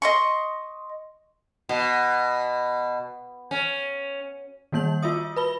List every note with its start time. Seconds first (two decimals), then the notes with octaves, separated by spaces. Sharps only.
0.02 D#5 C6 C#6
1.69 B2
3.51 C#4
4.72 D#3 G3 A#3 G6 F#7
5.03 F4 F#4 E5 D#6
5.36 B4 B5 G7